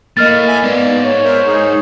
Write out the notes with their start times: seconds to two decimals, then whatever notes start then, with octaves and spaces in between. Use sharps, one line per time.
0.17 A2 A#3 D#5 F6 A6
0.48 E5 G#5
0.63 G#2 A#3 B3 D5
1.03 C#5
1.24 A#4 C5 E5
1.47 D#4 G#4